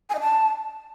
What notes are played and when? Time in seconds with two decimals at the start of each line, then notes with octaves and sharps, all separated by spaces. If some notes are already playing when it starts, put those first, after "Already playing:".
0.09 G#5
0.15 D#5
0.20 A5